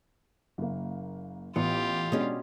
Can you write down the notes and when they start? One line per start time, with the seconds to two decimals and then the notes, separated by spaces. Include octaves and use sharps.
0.58 F#1 A#3
1.56 A1 B3 F4 G4
2.12 B2 G#3 B3 C#4 D4 D5